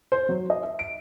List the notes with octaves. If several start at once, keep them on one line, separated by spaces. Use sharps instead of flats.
C5
F#3
D#5
E5
D7